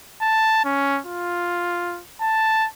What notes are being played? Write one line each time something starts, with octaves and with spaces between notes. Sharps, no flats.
A5
C#4
F4
A5